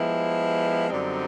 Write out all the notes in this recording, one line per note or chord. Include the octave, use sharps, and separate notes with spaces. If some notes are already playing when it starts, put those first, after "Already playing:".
Already playing: F3 G#3 B3 E4 G4
F#2 D3 G3 C4 D#4